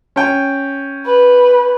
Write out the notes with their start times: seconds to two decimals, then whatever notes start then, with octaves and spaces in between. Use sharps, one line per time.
0.16 C#4 G5
1.06 B4